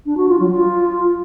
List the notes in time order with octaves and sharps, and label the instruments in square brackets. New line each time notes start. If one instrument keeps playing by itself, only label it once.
[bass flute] D4
F#4
F4
F#3
F4